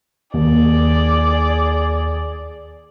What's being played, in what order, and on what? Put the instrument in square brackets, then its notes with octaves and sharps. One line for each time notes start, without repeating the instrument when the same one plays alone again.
[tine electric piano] D#2 [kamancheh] G#4 D5